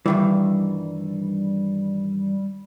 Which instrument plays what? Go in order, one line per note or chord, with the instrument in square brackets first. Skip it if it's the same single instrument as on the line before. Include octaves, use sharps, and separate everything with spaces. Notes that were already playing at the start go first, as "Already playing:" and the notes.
[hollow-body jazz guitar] G2 D#3 E3 [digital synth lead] G3